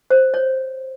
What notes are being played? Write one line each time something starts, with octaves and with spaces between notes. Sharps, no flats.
C5
C#5